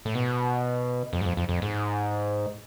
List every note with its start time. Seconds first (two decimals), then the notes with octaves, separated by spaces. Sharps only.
0.05 A2
0.15 B2
1.13 F2
1.21 G#2
1.25 F2
1.37 F2
1.49 F2
1.62 G#2